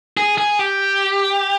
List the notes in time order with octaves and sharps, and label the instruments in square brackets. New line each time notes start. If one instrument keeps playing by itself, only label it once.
[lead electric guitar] G#4
G#4
G4